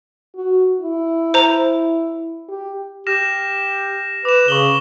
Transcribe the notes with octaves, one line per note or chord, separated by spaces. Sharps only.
F#4
E4
C5 A#5
G4
G4 F6 A#6 E7
B4 D6 E7
C#3 C#6 F#7 G7